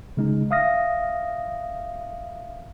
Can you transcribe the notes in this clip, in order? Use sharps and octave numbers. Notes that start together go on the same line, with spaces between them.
C#3 G#3 D#4
E5 F5 D#6 F6 A#6